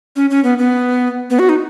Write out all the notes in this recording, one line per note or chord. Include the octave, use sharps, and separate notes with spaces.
C#4
C#4
B3
B3
B3
F#4
D#4